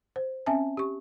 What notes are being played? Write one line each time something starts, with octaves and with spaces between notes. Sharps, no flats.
C5
C4 C#4 E5 G#5 A5
G4 C#6